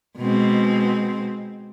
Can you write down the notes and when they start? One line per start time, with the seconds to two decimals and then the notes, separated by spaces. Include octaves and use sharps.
0.18 B2 G#3 C4